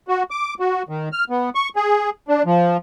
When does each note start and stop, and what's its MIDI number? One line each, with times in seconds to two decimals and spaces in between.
0.08 0.23 66
0.31 0.54 86
0.60 0.82 66
0.89 1.09 51
1.12 1.24 89
1.30 1.50 59
1.55 1.69 85
1.76 2.10 68
2.28 2.42 62
2.46 2.77 53